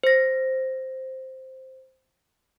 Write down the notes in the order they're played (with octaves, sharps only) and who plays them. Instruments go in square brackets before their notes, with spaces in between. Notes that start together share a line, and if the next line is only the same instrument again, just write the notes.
[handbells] C5 A#6